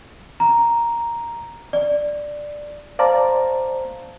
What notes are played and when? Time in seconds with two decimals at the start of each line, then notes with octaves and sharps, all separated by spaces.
0.40 A#5
1.73 D5
2.99 C5 D5 F5 A5 A#5